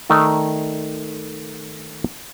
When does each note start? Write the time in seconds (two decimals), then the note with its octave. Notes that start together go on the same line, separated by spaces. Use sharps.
0.09 D#3 A3 D#4 D5